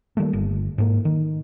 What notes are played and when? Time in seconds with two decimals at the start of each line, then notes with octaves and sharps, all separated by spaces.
0.17 D#3 G3 A3 A#3
0.33 G1
0.78 G#2 A#3
1.05 D#3